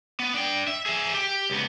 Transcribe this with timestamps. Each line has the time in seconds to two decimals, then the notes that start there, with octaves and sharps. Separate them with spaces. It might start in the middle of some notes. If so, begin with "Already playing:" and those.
0.20 B3
0.34 D4 G5
0.68 E5
0.86 G#4 E5
1.14 G4
1.50 C#2 B3